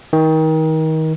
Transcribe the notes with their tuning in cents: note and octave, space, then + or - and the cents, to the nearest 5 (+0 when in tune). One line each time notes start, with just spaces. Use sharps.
D#3 +30